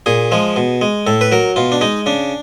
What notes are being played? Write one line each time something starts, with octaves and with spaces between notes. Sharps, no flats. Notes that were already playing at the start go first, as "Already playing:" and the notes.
A#2 G#4
F3 G#3
B2
G#3
A2 A4
B4
F#3 A#4
B2 F4
D4
G#3 D#4
C#3 D4